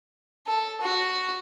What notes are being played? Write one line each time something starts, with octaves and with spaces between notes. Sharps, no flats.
A4
F#4